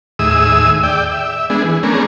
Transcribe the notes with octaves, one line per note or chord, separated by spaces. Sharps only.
D#2 A2 G#4 E5 D#6 E6
D5 G5
E5
G#3 B3 D4 G#4
E3
A3 B3 C#4 D4 G#4 A#4